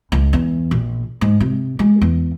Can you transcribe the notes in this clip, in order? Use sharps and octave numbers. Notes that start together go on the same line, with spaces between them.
C#2
E2
A#1
G#2
C3
G#3
E2